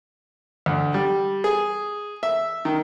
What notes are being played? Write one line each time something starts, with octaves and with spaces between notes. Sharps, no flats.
D2
G3
G#4
E5
D#3